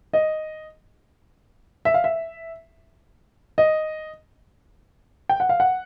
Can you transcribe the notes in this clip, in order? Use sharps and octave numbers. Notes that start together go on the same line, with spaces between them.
D#5
E5
F5
E5
D#5
G5
F#5
F5
F#5